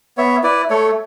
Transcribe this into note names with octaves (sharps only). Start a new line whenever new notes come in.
B3 C#5 E5
E4 B4 D5
A3 A4 C#5